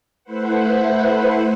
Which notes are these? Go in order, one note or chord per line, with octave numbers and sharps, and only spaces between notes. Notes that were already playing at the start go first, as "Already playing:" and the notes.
A3 E4 B4 C5 F#5